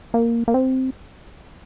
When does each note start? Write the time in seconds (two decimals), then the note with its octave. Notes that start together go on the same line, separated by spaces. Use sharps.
0.14 A#3
0.48 A#3
0.54 C4